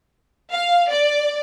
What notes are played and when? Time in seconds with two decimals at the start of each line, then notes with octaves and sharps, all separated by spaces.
0.52 F5
0.90 D5